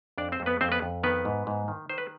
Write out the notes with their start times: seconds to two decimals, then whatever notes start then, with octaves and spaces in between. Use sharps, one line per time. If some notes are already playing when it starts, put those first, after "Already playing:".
0.18 F2 D4 D5
0.32 C4 C5
0.40 F2
0.46 B3 B4
0.61 F2 C4 C5
0.72 B3 B4
0.82 F2
1.03 D#3 B3 B4
1.25 G#2
1.47 G#2
1.68 D#3
1.89 D#3 C5
1.98 B4